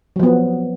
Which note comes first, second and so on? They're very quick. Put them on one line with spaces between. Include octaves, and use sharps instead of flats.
F#3 F3 B3